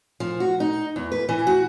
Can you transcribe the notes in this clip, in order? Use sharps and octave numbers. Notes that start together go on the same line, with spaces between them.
F3
F#4
D#4
E2
B4
E3
F#4